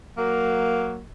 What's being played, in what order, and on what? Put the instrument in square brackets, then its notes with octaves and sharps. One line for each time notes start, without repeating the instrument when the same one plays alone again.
[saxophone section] F#3 A#3